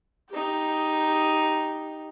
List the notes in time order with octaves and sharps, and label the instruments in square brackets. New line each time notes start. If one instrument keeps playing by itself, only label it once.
[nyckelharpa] D#4 G4